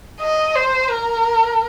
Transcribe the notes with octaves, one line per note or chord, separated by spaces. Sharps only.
D#5
C5
A#4